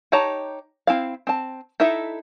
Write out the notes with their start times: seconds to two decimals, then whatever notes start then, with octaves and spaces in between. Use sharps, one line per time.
0.12 D#4 G4 C#5 A5 A#5
0.87 C4 E4 F5
1.27 C4 A5
1.80 D#4 E4 A4 E5